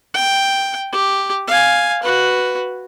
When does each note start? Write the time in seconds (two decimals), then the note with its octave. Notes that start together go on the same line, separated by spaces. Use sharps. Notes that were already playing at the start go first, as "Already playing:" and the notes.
0.14 G5
0.93 G4
1.48 F5 G#5
2.02 F#4 B4